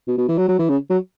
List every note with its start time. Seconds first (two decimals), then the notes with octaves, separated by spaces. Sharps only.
0.08 B2
0.18 B2
0.28 E3
0.38 F#3
0.48 F#3
0.59 E3
0.69 C#3
0.90 F#3